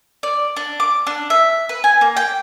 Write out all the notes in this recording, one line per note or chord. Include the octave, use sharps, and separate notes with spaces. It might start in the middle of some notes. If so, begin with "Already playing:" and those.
D5
D4
D6
D4
E5
B4
G#5
A#3
G5